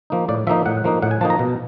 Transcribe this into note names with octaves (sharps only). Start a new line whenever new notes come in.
F3 A#3 D#4
A2 D5
F3 A#3 D#4 E5
A2 F#5
F3 A#3 D#4
A2 F#5
G#5
F3 A#3 D#4 A5
A#5
B2